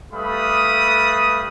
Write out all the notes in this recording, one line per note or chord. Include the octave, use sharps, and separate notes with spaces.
G3 A3 B4 F5 B5 D#6